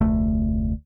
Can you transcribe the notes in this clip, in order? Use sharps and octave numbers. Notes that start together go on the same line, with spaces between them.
F1 D2 A3